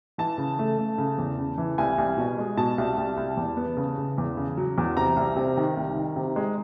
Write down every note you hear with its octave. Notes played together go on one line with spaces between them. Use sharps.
E3 A5
C#3
A3
A3
C#3
E2
C#3
E3
C2 G#5
C2
B2
G#3
B2 A5
C2
C2
C2
E2
B3
C#3
C#3
E2
C#3
F#3
E2
C3 A#5
C2
C3
D#3
C2
D#3
C3
G#3